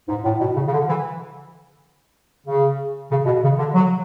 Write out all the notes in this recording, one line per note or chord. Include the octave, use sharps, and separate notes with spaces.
G#2
A2
B2
C#3
C#3
D3
E3
C#3
C#3
B2
C#3
D3
F#3